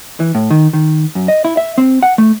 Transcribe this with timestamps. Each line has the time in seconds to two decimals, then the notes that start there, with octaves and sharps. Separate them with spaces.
0.20 E3
0.35 A2
0.50 D#3
0.73 D#3
1.15 F#2
1.28 D#5
1.45 E4
1.57 E5
1.78 C4
2.03 F#5
2.18 A3